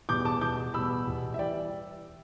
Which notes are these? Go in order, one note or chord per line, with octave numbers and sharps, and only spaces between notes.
E2 B2 G3 D6 G6
A5 D6
E2 B2 G3 D6 G6
E2 B2 G3 B5 E6
E2 B2 G3
E5
E3 G3 D5 G5